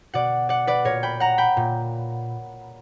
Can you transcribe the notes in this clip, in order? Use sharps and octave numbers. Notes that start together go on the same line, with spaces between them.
B2 D5 F#5
D5 F#5
B4 D5
A#2 A#4 C#5
G5 B5
F#5 A#5
G5 B5
A#2